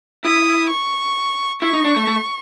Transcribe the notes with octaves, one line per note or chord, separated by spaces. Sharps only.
E4 D#6
C#6
E4 C#6
D#4
D4
A3
A3